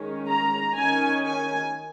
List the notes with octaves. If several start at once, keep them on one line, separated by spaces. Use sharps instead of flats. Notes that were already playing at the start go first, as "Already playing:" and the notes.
Already playing: D#3 G#3 C#4
A#5
D#3 C#4 G#5
G#5